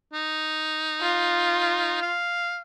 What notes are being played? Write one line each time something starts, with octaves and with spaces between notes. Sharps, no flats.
D#4
F4
F5